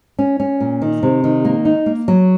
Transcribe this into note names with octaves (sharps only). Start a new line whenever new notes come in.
C#4
C#4
A#2
D#3
C3
D#3
A#3
D#4
A#3
F#3